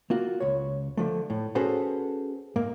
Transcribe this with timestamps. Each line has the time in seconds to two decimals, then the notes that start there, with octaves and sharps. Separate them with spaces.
0.10 A#3 F4 F#4
0.40 C#2 C#5
0.97 D3 F3 A3
1.30 A2
1.55 C#4 F#4 G#4 A4 B4 C5
2.56 G#2 A#3